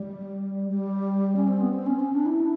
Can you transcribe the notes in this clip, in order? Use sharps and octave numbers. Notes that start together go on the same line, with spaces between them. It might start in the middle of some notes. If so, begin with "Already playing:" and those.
Already playing: G3
G3
C#4
C4
B3
C4
C#4
C#4
D4
E4